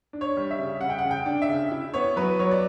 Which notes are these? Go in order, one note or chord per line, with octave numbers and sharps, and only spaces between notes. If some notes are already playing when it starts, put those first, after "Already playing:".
D4
C#5
G3
E5
C#3
C#3 F#5
G5
F#5
C#3
G5
D4
E5
C#3
E4
B3 C#5
F#3 B4
F#3 C#5
D5